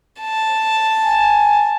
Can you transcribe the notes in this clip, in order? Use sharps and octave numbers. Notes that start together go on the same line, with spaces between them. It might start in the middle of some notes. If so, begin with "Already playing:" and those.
A5
G#5